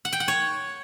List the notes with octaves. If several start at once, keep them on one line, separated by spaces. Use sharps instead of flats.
F#5
G5
F#5
C#5